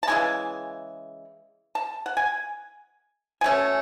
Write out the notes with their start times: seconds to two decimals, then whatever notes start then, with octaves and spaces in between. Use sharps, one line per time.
0.03 A5
0.07 C#3 E3 G#3 G#5
1.75 A5
2.06 F#5
2.17 G#5
3.41 B2 A3 C#4 G#5